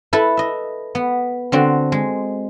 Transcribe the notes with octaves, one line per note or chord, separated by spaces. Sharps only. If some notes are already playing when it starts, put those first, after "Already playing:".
E4 A4 B4
D#5 E5
B3
D3 C4 F#4
G#3